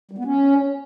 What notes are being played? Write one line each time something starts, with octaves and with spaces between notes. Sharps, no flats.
G3
B3
C#4